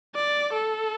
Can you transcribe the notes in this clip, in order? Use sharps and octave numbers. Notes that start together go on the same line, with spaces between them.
D5
A4